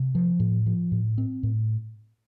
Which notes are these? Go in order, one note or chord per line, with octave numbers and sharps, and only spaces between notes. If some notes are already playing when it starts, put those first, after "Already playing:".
Already playing: C3
F3
A2
F3
A2
C4
A2